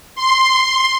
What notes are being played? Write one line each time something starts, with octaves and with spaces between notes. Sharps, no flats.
C6